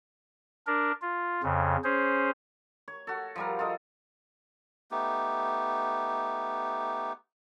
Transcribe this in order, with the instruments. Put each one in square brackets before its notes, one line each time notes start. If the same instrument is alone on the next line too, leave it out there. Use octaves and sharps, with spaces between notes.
[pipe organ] D4 A#4
F4
F2 C#3
C#4 G#4 C5
[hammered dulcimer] C#5
F#4 A4
F3 G3 A#4
F4 A4 D#5
[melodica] A3 B3 D#4 G4